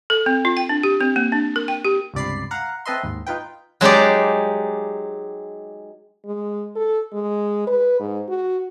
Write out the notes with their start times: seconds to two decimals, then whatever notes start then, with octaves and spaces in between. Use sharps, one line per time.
0.10 A4
0.26 C4
0.45 F4
0.57 G5
0.69 D4
0.83 G4
1.01 C4
1.16 A#3
1.32 D4
1.56 A#4
1.68 G5
1.85 G4
2.14 C#2 G2 C3 D5 B5 C7
2.51 F5 F#5 A#5
2.85 C4 A4 B4 D#5 E5 C6
3.03 D#2 G#2
3.26 D#4 F4 B4 G5
3.81 F#3 G#3 D#4 G4 D5
6.25 G#3
6.76 A4
7.12 G#3
7.67 B4
8.00 G#2
8.29 F#4